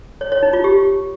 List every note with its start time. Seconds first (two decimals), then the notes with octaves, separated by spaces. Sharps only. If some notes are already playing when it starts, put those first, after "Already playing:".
0.21 C#5
0.32 C#5
0.43 D#4
0.53 F4
0.64 G4